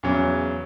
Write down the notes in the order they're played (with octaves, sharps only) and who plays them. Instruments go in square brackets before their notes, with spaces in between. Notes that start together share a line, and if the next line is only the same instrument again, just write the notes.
[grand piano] E2 C#3 F#3